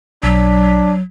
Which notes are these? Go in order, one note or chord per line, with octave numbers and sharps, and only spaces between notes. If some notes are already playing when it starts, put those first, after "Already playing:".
B1 F#3 D4 B6